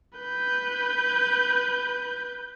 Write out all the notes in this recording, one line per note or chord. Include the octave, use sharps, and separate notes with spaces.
B4 G6